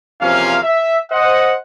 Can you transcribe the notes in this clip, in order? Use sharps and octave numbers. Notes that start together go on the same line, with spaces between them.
E2 C3 F3 A#3 C#4 F5
E5
C5 D#5 F#5